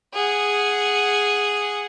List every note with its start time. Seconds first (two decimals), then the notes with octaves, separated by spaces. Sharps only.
0.14 G#4 F#5